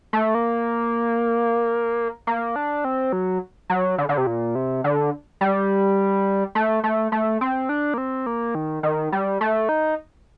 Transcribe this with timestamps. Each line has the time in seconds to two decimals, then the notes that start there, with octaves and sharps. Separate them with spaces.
0.13 A3
0.35 A#3
2.27 A#3
2.56 D4
2.85 C4
3.13 F#3
3.70 F#3
3.98 D3
4.09 D3
4.18 C3
4.27 A#2
4.55 C3
4.84 D3
5.41 G3
6.55 A3
6.84 A3
7.12 A3
7.41 C4
7.69 D4
7.94 A#3
7.98 C4
8.26 A#3
8.55 D#3
8.83 D#3
9.12 G3
9.41 A3
9.69 D#4